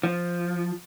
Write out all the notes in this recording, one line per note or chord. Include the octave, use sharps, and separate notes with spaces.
F3